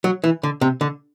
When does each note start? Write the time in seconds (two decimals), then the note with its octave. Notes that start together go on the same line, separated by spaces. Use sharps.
0.04 F#3
0.24 E3
0.43 D3
0.61 C3
0.81 D3